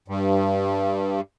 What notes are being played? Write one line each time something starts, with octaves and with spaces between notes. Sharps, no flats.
G2